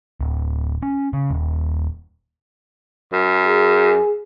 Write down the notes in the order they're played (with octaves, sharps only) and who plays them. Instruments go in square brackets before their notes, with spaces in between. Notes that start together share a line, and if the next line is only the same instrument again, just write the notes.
[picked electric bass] D1
C#4
C#3
D#1
[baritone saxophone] F#2
[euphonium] G#4